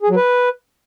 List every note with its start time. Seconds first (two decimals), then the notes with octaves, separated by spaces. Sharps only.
0.03 G#4
0.10 F#3
0.16 B4